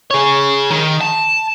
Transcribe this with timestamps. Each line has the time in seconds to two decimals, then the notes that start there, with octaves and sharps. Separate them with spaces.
0.11 G#4 C#5
0.70 D#3
1.01 A5